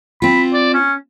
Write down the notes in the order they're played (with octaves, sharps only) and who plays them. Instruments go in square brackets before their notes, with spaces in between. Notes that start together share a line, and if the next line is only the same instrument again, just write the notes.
[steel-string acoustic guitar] C4 F4 [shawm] B5
[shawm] D5
C#4